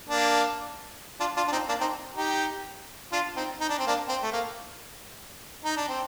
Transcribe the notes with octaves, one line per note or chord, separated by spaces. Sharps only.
A#3 D4
D4 F4
D4 F4
D4
C4 D#4
A#3 D4
C4 D#4
D#4 G4
D4 F4
C4 D#4
D#4
D4
C4
A#3 D4
C4
A3
A#3
D#4
D4
C4